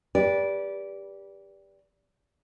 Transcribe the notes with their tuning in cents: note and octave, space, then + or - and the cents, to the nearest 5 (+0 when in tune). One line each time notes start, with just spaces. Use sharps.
G4 +20 B4 -25 D5 -15